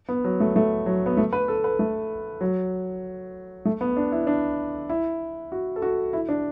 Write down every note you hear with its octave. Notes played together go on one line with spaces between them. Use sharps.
B3
F#3
A3
A3
F#3
B3
A3
B4
A4
B4
A3
F#3
A3
B3
D4
E4
D4
E4
F#4
A4
F#4
E4
D4